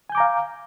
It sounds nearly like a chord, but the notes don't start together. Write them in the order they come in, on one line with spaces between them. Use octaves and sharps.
G#5 G6 D6 A#5 F5